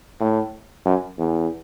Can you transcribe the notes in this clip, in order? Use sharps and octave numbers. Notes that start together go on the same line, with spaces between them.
A2
F#2
E2